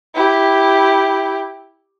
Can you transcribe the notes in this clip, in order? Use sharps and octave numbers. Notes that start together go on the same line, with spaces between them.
E4 G4